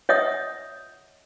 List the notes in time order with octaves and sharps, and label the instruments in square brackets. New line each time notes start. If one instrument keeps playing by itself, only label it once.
[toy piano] C#5 D#5 E5 F#5 D#6